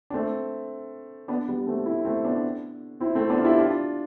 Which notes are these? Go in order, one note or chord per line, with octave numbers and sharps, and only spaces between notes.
D4
A3 C4
B3 D4
G3 B3
A3 C4
C4 E4
A3 C4
B3 D4
C4 E4
A3 C4
B3 D4
F4
E4 G4
D4 F4